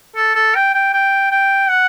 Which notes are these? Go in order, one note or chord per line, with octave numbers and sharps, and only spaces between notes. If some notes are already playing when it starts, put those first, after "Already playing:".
A4
A4
G5
G5
G5
G5
F#5